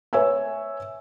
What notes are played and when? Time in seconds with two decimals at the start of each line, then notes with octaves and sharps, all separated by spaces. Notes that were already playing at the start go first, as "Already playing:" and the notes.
0.13 B4 C#5 E5 G#5 E6